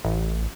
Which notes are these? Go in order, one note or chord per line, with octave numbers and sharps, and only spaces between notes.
A1